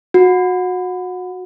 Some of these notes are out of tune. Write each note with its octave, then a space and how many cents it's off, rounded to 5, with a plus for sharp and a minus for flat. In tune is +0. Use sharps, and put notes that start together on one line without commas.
F#4 -25